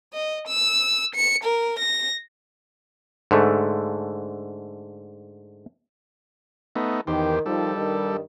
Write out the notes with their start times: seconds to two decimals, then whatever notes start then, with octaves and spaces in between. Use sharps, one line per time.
0.14 D#5
0.48 E6
1.15 C#7
1.44 A#4
1.79 A#6
3.31 G#2 D3 A3
6.76 A3 B3 D#4
7.07 E2 D#3 G4 C5
7.46 D#3 F3 G3 A4
7.76 G2 D#3